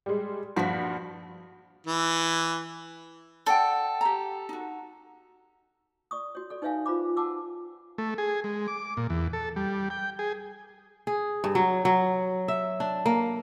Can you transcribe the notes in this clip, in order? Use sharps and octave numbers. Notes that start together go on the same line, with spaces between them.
G3 G#3
G2 A#2 F3 F#4 B6
E3
A4 D5 F#5 G5
G4 A#5
D#4 F#4
D5 C#6 D#6
F#4 C#5
A4 D5
D#4 B4 C#5 E5 F5 G#5
F4 C5 B5 D6
F#5 A5 D6 E6
A3
G#4
G#3
D6
A#2
E2
A4
G3
G5
G#4
G#4
G2
F#3
F#3
E5
D4
A#3